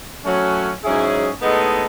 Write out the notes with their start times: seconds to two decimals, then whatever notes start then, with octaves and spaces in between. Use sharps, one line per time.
0.25 F#3 A3 C#4
0.83 G#2 F#3 C#4 E4 G#4
1.41 A2 G#3 B3 D#4 A4